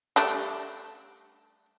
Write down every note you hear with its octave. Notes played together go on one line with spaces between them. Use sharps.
G3 A3 D4